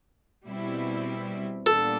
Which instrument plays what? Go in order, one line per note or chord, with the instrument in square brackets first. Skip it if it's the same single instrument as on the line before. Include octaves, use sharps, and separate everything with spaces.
[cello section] B2 G3 C4 E4
[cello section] A#2 G3 B3 D4 [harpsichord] A4